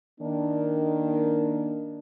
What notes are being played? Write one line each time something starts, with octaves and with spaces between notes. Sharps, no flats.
D#3 A#3 D4